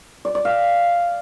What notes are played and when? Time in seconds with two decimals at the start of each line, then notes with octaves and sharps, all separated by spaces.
0.25 D5
0.35 D5
0.45 F5